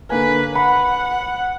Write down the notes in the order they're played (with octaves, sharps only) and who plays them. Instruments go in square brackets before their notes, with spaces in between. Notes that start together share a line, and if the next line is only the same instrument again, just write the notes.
[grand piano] D3 A#3 G#5 [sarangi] B4
[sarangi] F#5 [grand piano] B5